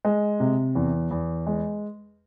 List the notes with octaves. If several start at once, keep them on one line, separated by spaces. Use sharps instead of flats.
G#3
C3
E2
E2
G#3